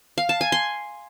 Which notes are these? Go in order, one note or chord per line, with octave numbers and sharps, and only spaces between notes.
F5
A5
G#5
C6